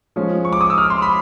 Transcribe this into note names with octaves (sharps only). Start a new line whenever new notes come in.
F3 G#3 C#4
C#6
D6
D#6
E6
F6
C6
B5